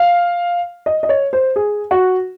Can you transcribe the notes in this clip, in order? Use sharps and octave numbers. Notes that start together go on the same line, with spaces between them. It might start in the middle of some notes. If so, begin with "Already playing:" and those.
Already playing: F5
D#5
D#5
C#5
C5
G#4
F#4